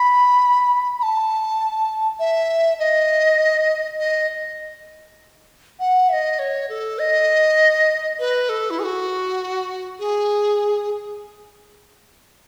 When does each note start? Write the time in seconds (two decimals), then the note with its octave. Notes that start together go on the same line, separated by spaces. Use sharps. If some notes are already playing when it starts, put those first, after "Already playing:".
Already playing: B5
0.99 B5
1.03 A5
2.20 E5
2.79 D#5
4.00 D#5
5.80 F#5
6.09 E5
6.13 D#5
6.39 C#5
6.69 A4
6.99 D#5
8.19 B4
8.49 A4
8.70 E4
8.79 G#4
8.84 F#4
9.99 G#4